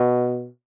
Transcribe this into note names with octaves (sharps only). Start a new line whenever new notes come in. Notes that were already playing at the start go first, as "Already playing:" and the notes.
Already playing: B2